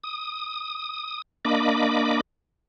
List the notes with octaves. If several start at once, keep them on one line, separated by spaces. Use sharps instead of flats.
D#6
A#3 D4 D#5 B5 D6